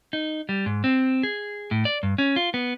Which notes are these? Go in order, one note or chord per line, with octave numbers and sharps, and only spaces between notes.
D#4
G3
G#2
C4
G#4
A2
D5
G2
C#4
F4
B3